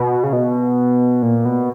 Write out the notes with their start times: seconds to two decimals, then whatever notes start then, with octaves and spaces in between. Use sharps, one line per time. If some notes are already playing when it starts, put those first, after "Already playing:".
Already playing: B2
0.24 C#3
0.33 B2
1.22 A#2
1.45 B2